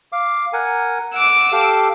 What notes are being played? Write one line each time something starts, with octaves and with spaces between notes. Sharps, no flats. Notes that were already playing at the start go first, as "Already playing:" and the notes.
F5 D6
A#4 F#5 G#5
F#5 D6 E6
G4 A4 F5